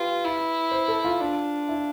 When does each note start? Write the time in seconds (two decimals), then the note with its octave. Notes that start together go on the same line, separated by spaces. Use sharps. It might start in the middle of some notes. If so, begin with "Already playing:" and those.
Already playing: F4 G4 B4
0.24 E4
0.72 C5
0.88 A4
1.05 F4
1.21 D4
1.69 E4